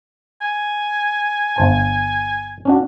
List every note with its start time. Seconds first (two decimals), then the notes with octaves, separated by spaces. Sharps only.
0.41 G#5
1.56 G1 C5 A5
2.65 C#4 D4 F#4